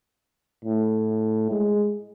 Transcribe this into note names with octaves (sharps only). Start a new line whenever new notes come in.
A2
G#3